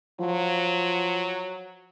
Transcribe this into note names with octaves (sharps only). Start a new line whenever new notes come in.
F3 F#3